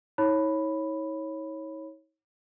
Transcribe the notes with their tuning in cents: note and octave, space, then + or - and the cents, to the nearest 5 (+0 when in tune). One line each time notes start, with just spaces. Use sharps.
D#4 +45 C#5 -15 B5 +0